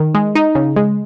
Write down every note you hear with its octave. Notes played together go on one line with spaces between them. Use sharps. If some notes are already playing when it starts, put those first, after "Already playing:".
Already playing: D#3
G#3
D#4
C#3
G#3